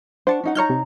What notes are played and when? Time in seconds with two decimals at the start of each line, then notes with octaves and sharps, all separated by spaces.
0.27 D4 C5 F#5 A5 C#6
0.44 C#4 D#4 F#5
0.55 D#4 C#5 A#5 C#6 F6 G6
0.70 C3